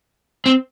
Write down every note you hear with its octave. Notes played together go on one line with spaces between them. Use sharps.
C4